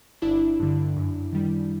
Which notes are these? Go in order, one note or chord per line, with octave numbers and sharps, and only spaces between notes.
G1 D4 E4
G2 D3
F#2
D#3 G3